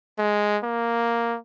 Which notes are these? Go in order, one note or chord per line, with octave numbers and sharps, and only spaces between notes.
G#3
A#3